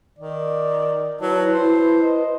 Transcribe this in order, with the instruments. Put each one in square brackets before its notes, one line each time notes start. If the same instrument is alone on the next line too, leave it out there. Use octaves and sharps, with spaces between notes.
[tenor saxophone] D#3 [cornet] D5
[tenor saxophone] F#3 [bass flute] E4 [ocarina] B4 [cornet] A5
[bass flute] E4 [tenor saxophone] C5
[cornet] D#5